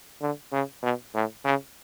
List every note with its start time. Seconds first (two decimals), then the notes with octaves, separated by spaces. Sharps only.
0.22 D3
0.52 C#3
0.83 B2
1.14 A2
1.45 C#3